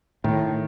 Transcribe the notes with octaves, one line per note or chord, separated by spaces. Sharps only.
A2 D#3